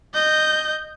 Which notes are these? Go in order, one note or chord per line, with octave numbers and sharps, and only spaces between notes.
D#5 G6